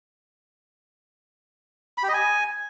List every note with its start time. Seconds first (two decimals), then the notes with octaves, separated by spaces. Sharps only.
1.98 B5
2.03 G4
2.08 D#5
2.14 G#5